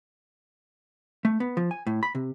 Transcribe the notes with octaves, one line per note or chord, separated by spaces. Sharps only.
A3
B3
F3
G#5
A2
B5
C3